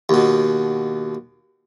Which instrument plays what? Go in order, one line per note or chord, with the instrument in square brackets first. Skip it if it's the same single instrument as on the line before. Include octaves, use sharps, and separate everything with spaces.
[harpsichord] D#2 B2